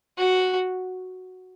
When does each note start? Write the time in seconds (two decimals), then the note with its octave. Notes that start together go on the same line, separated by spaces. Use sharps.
0.18 F#4